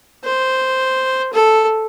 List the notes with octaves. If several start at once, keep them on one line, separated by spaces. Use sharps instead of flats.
C5
A4